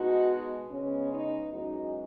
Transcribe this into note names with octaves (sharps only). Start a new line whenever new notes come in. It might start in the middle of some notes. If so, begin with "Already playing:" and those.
Already playing: B2 G#3 B3 D#4 F#4
C#3 G#3 B3 C#4
D#4
F#2 E3 G#3 D#4 F#4